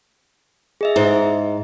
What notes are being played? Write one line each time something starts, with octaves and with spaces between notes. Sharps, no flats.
G#4 D#5 E5
G#2